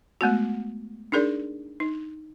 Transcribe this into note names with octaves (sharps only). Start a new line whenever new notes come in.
G#3 A3 B3 F#4
D4 D#4 G#4 A#4 D5
D#4